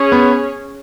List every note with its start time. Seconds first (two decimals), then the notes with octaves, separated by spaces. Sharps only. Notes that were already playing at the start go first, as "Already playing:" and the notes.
Already playing: C#4 G#4 C#5
0.12 B3